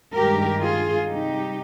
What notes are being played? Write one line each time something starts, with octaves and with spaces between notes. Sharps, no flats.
G2 D#3 G#3 G4 A#4
F4 G#4
C3 G3 D#4 G4